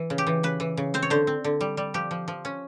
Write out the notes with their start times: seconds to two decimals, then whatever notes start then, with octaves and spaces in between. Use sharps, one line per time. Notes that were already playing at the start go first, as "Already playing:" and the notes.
Already playing: E3
0.10 C#3
0.18 G4
0.27 E3
0.43 C#3 B4
0.60 E3
0.77 C#3
0.94 C4 C5
1.02 C#5
1.10 D3 C5
1.27 C4
1.44 D3
1.61 G3
1.77 G3
1.94 F3 G4
2.11 F3
2.28 F3
2.45 C#4